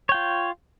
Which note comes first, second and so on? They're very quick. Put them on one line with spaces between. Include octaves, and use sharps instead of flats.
C#5 G5 F4